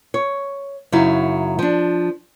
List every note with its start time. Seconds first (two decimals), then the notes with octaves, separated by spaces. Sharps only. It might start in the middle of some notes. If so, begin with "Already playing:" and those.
0.14 C#5
0.92 F#2 C#3 F#3 D#4 E4
1.59 F3 D4